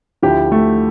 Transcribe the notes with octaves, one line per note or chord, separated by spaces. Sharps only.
D2 D3 F3 E4 G4
A3